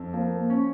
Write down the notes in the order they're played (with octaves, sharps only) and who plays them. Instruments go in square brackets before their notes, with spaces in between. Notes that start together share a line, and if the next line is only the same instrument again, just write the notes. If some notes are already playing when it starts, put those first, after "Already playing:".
Already playing: [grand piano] F2
[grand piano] F3 [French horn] A#3
[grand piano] C#4